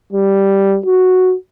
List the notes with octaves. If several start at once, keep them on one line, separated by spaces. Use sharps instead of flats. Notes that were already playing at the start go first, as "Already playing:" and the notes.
G3
F#4